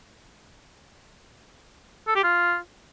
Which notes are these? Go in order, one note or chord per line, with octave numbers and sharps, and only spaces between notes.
A4
G4
F4